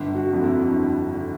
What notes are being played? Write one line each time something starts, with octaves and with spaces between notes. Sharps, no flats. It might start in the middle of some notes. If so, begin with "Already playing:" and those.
Already playing: G1
F#4
F2 D3
E4
G1
D3